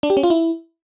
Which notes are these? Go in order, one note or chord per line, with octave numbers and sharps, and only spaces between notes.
D4
G4
C#4
F4
E4